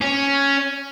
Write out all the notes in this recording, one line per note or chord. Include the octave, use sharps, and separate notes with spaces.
C#4